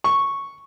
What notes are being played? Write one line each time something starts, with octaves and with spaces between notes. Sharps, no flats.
C#6